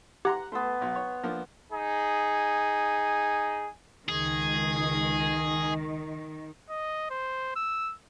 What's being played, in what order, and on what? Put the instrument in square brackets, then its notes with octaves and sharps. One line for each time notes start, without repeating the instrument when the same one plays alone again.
[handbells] G4 [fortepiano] F#5 A#5 C6
[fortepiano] A3 [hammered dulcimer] B3 A5 C6
[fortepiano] B1
C#5
F3 A#3 D4
[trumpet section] D#4 G#4
[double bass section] C#2 [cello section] D#3 [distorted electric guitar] G#4
[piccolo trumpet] D#5
C5
E6